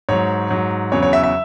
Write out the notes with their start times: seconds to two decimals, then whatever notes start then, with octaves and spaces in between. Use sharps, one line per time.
0.09 G#2 F#3 C#5
0.50 G#2 F#3
0.92 E2 C#3 F#3 C#5
1.03 C#5
1.13 E5
1.23 E5